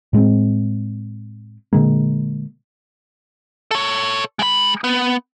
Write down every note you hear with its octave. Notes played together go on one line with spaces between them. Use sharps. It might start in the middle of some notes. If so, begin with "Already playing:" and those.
A2 G#3 A#3 C4
A#2 D3 G#3 A#3
A4 C#5
G#3 B5
B3